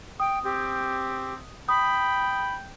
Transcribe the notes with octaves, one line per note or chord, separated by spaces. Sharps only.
G5 D#6
C4 G4
G5 B5 D#6